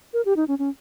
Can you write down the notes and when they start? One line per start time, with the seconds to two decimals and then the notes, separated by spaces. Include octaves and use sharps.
0.13 A#4
0.25 G4
0.36 D#4
0.48 C#4
0.59 C#4